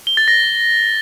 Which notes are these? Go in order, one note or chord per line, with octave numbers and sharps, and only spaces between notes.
G7
A6
A#6